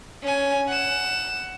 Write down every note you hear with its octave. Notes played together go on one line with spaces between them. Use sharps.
C#4 G#5
F#5 E7